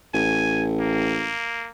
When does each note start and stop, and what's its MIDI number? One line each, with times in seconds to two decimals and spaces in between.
0.14 1.33 33
0.14 0.66 80
0.80 1.70 58